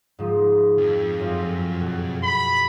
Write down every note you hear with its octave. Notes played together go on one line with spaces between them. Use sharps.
G#2 F3
F2
F#2 F3
B2
B5